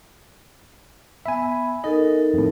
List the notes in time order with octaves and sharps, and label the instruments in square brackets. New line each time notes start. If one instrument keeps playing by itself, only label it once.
[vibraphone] B3 B5 [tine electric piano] E5 G#5
[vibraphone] D#4 A4 A#4 [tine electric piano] D#5
[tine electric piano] F2 A2